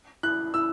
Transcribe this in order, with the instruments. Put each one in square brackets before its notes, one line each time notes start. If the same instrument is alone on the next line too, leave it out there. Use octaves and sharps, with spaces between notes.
[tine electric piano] E4 [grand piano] F#6
[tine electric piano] E4 [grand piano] E6